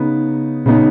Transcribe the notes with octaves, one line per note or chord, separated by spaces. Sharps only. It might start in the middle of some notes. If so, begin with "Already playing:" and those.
Already playing: C#3 B3 D#4
C#3 B3 D#4